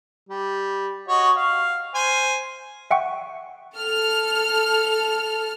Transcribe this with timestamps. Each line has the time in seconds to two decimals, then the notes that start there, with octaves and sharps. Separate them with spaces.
0.29 G3
1.08 F#4 C#5 D#5
1.36 F5
1.95 C5 G#5
2.91 E5 F#5 G5 C#6
3.77 A4 F6